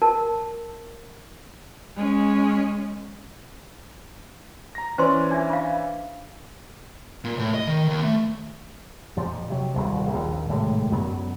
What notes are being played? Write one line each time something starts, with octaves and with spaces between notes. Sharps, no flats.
A#4 A5
G#3 C#4
A#5 A#6
E3 C#4 C5 D5 C6
D4 E5
F5 B5
A#2
A2
D#5
D#3
D#2
A3
F2 A#2 F3
C3 F#3
D#1 C2 B2
A#1 D#2
G#1 A2 C3 G#3
F#2 D3 F#3 B3